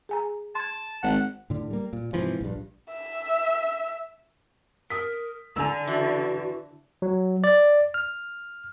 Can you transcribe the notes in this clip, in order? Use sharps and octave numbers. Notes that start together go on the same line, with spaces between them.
G#4 G#5 A#5
A5 C6 G#6
G#1 F#5
A2 D3
G3 A#3
A#2
G#2 C3 E3 F3
A#1 G2
E5
A#4 D#6 B6
D3 G#5 A#5 E6
E3 F#4
F#3
D5
F6